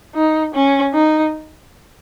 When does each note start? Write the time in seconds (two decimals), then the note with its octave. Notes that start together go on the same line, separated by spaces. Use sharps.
0.15 D#4
0.54 C#4
0.94 D#4